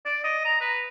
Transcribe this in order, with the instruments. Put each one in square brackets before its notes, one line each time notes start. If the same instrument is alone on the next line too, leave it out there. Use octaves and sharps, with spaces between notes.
[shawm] D5
D#5
A#5
B4